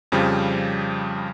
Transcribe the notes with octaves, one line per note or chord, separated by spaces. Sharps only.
F2 C#3 F3 G3